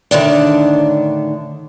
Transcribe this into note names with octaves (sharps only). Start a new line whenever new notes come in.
A2 D3 D#3 D4